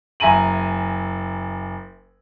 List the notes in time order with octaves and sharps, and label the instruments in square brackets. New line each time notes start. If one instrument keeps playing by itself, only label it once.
[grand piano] F#1 E5 G#5 A#5 D#7 F#7